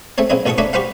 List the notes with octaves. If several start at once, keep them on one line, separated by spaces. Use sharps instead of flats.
A3 C4 A4 C#5
B1 C#3 C4 E4 D#5
A1 B2 F#4 A4 C#6 D#6
A3 A#3 D4 B4 C#5 D#5
F#4 G4 B4 C5 F5 F#5